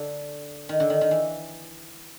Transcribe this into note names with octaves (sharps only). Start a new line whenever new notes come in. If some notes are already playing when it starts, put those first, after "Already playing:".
Already playing: D3
D#3
D3
D#3
D#3
E3